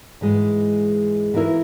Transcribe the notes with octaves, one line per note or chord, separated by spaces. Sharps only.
G#2 E3 G#3
E3 A#3 E4 A#4